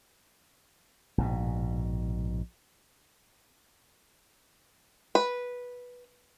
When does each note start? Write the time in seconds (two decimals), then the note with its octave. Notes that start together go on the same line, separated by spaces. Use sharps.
1.18 A#1 G#2 B2
5.15 B4